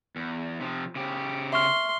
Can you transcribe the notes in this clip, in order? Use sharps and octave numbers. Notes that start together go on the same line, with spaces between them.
E2
C3 F3
C#3 G4
E5 C6 C#6 F6